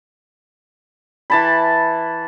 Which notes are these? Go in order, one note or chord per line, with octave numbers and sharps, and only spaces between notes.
E3 A5 B5